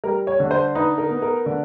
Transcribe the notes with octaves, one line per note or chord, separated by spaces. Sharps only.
G3 A#4
C#5
D3
C5
D#4 B4
A#4
B3
A#4
D3